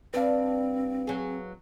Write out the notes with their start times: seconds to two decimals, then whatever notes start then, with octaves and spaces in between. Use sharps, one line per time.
0.14 G2 C4 D4 B4 F5
1.07 F#3 G#4